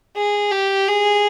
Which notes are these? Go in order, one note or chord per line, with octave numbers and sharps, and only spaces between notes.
G#4
G4
G#4